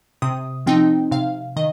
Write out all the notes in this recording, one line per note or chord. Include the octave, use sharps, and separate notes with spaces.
C3 D#6
F3 C4 D#4 G5
C3 F5
D#3 D#5